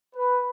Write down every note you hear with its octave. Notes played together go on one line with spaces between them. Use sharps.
B4